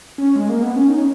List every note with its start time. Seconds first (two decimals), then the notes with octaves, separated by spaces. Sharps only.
0.18 C#4
0.36 G#3
0.49 A#3
0.62 B3
0.76 C#4
0.89 D#4
0.98 C#4